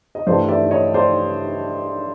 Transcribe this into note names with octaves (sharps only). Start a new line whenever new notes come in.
D#5
G2 E3 A3 C5 D5
D5 E5
C#5 D#5
C5 D5